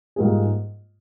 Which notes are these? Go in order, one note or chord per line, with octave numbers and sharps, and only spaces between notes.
G#2 G3 A#3 F4 G#4